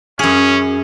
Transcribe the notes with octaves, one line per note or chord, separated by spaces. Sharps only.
F#2 C#4 G#4